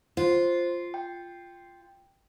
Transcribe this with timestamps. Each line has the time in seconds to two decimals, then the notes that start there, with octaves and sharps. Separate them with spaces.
0.17 F4 C5
0.94 G5